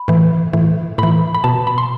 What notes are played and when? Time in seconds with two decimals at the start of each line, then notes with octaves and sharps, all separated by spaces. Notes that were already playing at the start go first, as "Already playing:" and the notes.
Already playing: B5
0.08 A2 E3
0.53 A2 E3
0.98 A2 E3 B5
1.35 B5
1.44 B2 A5
1.67 B5
1.78 C6